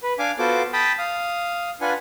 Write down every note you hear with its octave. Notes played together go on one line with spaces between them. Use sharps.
B4
D4 F5 G#5 D6
B3 F4 F#4 A4 C5 D6
G5 A5 B5 D#6
F5 D#6
D4 F4 B4 F#5 G#5